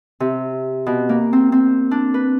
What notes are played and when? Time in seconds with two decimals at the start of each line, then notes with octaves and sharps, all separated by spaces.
0.20 C3
0.86 B2
1.09 A#3
1.33 C4
1.52 C4
1.91 D4
2.14 B4